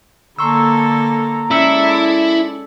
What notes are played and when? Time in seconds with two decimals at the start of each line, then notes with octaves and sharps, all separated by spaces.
0.39 D3 A#3 A4 A#5 C6 C#6 E6
1.51 G#3 C#4 E4 A4 D5 E6 C#7